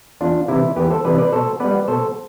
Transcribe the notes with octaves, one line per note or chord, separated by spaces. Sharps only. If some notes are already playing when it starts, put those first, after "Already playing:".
E2 D4 F4
C3 E3 E4
E2 G4 B4
A4 C5
C3 E3 B4 D5
B4 D5
B2 A4 C5
G3 B3 B4 D5
B2 A4 C5